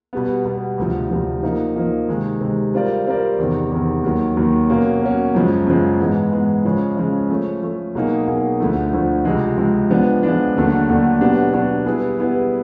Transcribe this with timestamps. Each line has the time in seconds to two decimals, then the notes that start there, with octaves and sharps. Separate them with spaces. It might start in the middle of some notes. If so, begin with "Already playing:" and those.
0.13 B2 G3 B3
0.45 B2 G3 B3
0.78 D2 C3 F3
1.10 D2 C3 F3
1.43 F3 A#3 D#4
1.76 F3 A#3 D#4
2.09 C3 D#3 G#3
2.41 C3 D#3 G#3
2.74 G3 C4 F4 A#4 D5
3.06 G3 C4 F4 A#4 D5
3.39 E2 C3 D#3
3.71 E2 C3 D#3
4.03 D#2 D#3 F#3
4.37 D#2 D#3 F#3
4.69 B2 F#3 A#3 C#4
5.02 B2 F#3 A#3 C#4
5.34 F#2 C#3 F3 G#3
5.67 F#2 C#3 F3 G#3
6.00 G#2 E3 G#3 B3
6.32 G#2 E3 G#3 B3
6.65 C#3 F3 G#3 C#4
6.97 C#3 F3 G#3 C#4
7.30 F3 A3 C#4
7.63 F3 A3 C#4
7.95 B2 F#3 A#3 D#4 G#4
8.27 B2 F#3 A#3 D#4 G#4
8.60 D2 D3 F3 A3
8.93 D2 D3 F3 A3
9.25 C#2 C3 F3 G#3
9.58 C#2 C3 F3 G#3
9.90 F3 G#3 B3 D4
10.23 F3 G#3 B3 D4
10.56 D#2 D3 F#3 A3 D4
10.88 D#2 D3 F#3 A3 D4
11.20 B2 F#3 B3 D4 G4
11.54 B2 F#3 B3 D4 G4
11.86 G3 B3 E4 G#4 B4
12.19 G3 B3 E4 G#4 B4